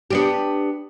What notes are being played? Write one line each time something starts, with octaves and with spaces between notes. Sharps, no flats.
B3 D4 G4